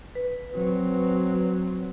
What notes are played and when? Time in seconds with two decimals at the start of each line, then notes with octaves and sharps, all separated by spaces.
0.15 B4
0.55 F#3 C4